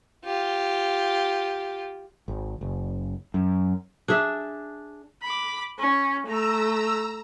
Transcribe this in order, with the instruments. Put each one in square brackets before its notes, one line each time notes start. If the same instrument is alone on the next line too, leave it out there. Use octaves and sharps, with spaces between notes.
[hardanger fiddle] F4 G4
[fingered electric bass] G#1
F#1
F#2
[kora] D4 G#4 E5
[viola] B5 D6
C#4
[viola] A3 [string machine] A#5 E6